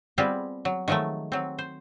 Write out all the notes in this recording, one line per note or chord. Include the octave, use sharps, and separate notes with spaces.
G3 B3 C4 F4 G4 G#4
F#3
D#3 F3 F#3 G#3 A3
F#3 C4
C5